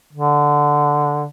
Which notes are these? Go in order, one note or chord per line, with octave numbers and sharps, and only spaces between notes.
D3